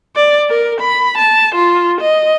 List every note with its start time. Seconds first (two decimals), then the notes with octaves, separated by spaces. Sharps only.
0.16 D5
0.50 A#4
0.81 B5
1.18 A5
1.55 F4
2.01 D#5